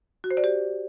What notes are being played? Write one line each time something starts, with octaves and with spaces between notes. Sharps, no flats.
F#4
C5
D5
G4